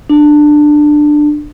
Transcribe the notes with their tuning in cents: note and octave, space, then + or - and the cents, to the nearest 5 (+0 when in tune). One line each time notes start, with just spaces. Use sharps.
D4 +15